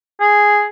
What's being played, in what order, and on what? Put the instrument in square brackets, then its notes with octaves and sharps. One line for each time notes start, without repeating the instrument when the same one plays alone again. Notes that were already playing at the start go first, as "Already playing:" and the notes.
[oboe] G#4